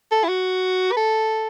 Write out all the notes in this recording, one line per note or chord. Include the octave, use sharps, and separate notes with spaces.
A4
E4
F#4
B4
A4